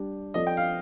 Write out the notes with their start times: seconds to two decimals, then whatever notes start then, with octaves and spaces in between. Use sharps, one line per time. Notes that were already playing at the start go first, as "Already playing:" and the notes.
Already playing: G3 D4 G4
0.34 F3 C4 F4 A4 D5 D#5
0.47 G5
0.57 F5